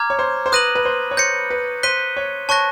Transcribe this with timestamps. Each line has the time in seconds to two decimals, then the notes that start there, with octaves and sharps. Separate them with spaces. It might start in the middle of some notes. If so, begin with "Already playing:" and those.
Already playing: A#5 D6 F6 G#6
0.10 C#5
0.19 C5
0.46 C5
0.52 B4 D#6 F#6 A#6 D#7 F#7
0.75 B4
0.85 C5
1.11 C#5
1.17 C5 G6 A#6 C#7
1.50 B4
1.83 C5 F#6 B6 D#7 G7
2.17 C#5
2.49 C#5 A5 C#6 F#6 A#6